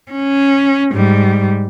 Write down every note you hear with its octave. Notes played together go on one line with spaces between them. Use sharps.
C#4
G#2 G3